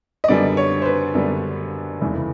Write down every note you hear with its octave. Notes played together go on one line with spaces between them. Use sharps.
D#5
F#2 D3 G3 B3 D4 D5
C#5
C5
B4
F#2 D3 G3 B3 D4
F1 E2 C#3 E3